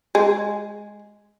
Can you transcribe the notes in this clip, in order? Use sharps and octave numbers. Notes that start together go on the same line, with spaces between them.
G#3